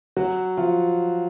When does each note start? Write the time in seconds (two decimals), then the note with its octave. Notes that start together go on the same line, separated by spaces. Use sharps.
0.17 F#3 F#4
0.57 F3 F4